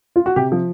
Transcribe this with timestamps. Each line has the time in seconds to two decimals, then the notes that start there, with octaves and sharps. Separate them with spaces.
0.16 F4
0.26 F#4
0.36 C3 G4
0.52 F3